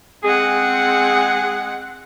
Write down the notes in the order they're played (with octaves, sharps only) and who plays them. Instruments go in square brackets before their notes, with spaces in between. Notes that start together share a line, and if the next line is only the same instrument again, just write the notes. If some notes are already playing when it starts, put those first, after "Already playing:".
[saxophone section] G#3 G#4 [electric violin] C4 F#5